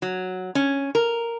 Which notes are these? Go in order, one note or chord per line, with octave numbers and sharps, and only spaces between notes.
F#3
C#4
A#4